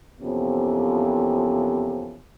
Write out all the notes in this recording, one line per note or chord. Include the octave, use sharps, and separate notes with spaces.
F2 C3 E3 A#3 B3 C#4